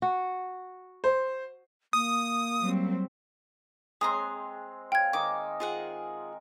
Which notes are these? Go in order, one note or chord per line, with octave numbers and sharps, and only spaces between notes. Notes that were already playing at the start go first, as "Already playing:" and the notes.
F#4
C5
A#3 D#6
F#3 G3 C4
G#3 C4 G#4 A#5 C6 D#6
F5 G5 G#6
D#3 D#5 G#5 D6
F4 G#4 F#5